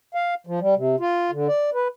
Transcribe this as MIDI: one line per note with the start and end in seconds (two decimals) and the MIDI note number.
0.15 0.34 77
0.47 0.60 53
0.60 0.75 55
0.76 0.96 48
1.00 1.31 65
1.31 1.47 50
1.47 1.70 74
1.74 1.88 71